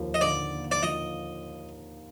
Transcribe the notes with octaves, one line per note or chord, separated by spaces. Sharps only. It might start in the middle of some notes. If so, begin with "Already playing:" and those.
Already playing: D#2 F3 A#3
D#5
D3 D5
A#3
D5
F3 D#5